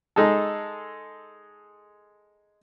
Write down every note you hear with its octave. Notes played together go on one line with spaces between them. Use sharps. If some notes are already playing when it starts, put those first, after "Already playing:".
G#3 D#4 G#4 A4